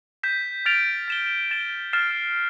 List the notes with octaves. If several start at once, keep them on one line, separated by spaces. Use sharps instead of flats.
G6 B6 E7
F6 A6 D7 F7
A6 E7 G7
A6 E7 G7
F6 A6 C7 E7